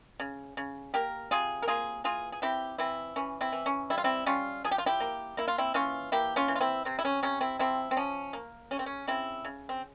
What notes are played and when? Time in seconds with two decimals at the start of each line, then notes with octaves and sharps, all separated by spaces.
0.20 C#3
0.57 C#3
0.94 A#3 G4 A#4
1.31 C3 F4 G#4
1.62 A#4
1.68 A#3 F4 G#4
2.04 E3 F4 G#4
2.32 G#4
2.42 C4 E4 G4
2.78 E3 C4 E4
3.16 E3 C#4
3.41 C4 E4
3.52 E3
3.66 C#4
3.90 G3 E4
3.98 F4
4.04 C4 E4
4.26 G3 C#4 F4
4.64 F3 G#4
4.71 G4
4.78 F4
4.86 E4 G4
5.00 A#3
5.37 A#3 E4
5.48 F4
5.58 C4 E4
5.74 E3 C#4 F4
6.12 A#3 E4 G4
6.36 C#4 F4
6.48 E3
6.56 F4
6.61 C4 E4
6.85 C3 C4
6.99 E4
7.05 C#4
7.23 C3 C#4
7.41 C4 E4
7.59 F3 C4 E4
7.91 C4
7.97 F3 C#4
8.33 A#3
8.71 C#3 C#4
8.79 C4
8.86 C#4
9.07 C#3 C4 E4
9.45 C#3
9.69 C4